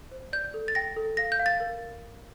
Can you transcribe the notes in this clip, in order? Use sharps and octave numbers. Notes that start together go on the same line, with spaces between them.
C5
D5 G6
A4
A6
G5 A#6
A4
F5 A#6
G6
F5
A6
A#4